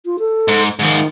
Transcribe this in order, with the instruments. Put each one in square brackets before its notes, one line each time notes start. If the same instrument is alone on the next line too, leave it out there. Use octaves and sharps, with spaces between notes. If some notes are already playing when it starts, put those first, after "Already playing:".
[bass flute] F4
A4
[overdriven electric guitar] G#2
[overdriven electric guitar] G#2 F3 [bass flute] D#3